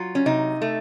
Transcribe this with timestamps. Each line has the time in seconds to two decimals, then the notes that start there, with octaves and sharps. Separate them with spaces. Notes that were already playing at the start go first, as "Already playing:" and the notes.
Already playing: F#3 F4
0.15 C#4
0.26 C3 D#4
0.62 A3